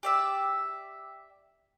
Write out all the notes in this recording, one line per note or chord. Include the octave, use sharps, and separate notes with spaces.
G4 D5 E5